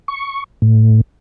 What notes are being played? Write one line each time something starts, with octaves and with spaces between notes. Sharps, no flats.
C#6
A2